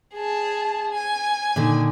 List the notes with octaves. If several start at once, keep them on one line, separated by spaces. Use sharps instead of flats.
G#4 A5
G#5
A#2 D3 D#3